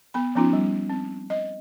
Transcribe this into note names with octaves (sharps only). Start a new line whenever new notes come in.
B3 B5
F3 B3 C#4 D#4 F4
G3
C4
D#5